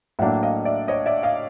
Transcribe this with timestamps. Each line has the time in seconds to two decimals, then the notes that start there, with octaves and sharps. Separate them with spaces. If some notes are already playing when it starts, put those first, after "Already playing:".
0.19 A2 F#3 A#3 D4 E5 F#5
0.43 D#5 F5
0.65 D5 E5
0.88 C#5 D#5
1.06 D5 E5
1.23 D#5 F5